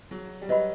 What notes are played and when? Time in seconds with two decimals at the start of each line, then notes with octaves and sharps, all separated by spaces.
0.11 F#3 G#4
0.42 G3
0.49 F#3 B4 D#5 F#5 B5